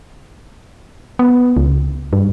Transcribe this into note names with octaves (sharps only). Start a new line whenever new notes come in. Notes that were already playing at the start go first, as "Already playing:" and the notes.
B3
C#2
G2